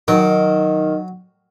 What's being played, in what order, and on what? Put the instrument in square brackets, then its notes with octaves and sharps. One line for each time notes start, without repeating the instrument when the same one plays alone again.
[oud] D#3 [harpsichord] F#3